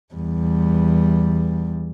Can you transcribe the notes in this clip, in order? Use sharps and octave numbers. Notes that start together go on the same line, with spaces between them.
E2 G3